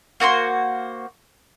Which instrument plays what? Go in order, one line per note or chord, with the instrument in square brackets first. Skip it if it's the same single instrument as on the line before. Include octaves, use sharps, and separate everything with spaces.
[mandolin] A#3 F#4 A4 C5